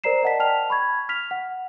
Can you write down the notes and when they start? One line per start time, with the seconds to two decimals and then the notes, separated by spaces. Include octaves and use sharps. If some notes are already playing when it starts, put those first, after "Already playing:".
0.04 A#4 C5 D5 A#5 C7 E7
0.23 D5 D#5 F#5 A5 B6
0.39 G5 A5 F6 F7
0.70 B5 C#6 G#6
1.09 F6 B6 F7
1.31 F#5